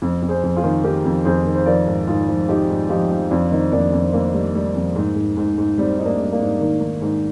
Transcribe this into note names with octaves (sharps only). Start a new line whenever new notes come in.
F2
F2
G#4 C5
F2
F4 G#4
D#3
D#3 G4 A#4
F2
F2 G#4 C5
D#3
C5
F3 A#4 D5
G#2
G#2 F4 G#4
F3
F3 D#4 G4
G#2
F3 D#4 G4
F3
F2 D4 F4
D#3 C4 D#4
F2 A#3 D4
F2 C4
F2 A#3
G3
G3
F2
G#2
G#2
G#2
G#2
G3 C4
G#2 D#4
A#3 D4
G3
A#3 D4
G#2
D#3
D#3
G#2